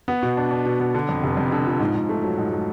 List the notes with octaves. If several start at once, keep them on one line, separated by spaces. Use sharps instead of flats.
B3
B2
D4
D4
B2
B3
D3
F2
F1
F2
D3
F3
G#2
G#2
A3
F#3
G#2
A3